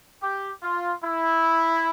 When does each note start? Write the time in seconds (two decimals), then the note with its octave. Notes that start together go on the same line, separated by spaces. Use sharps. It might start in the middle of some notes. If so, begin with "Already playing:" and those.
0.22 G4
0.63 F4
1.04 E4